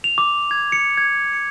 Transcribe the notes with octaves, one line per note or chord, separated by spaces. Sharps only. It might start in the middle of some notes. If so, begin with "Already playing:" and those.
F7
D6
G#6
C#7
G#6
C#7